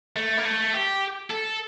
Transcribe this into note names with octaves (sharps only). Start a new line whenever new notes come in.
A3
A#3
A3
G4
A4